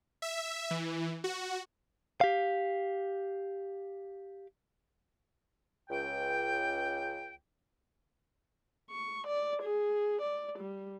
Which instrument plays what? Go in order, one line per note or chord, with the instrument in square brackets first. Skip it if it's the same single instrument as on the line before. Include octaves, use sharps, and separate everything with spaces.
[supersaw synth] E5
E3
F#4
[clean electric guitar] G4 F5
[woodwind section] C#2 G5
[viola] C#6
D5
G#4
D5
G3